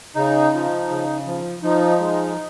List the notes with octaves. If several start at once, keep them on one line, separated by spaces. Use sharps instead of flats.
C#3 D#4
F3
C#3
F3
F3 D#4
G#3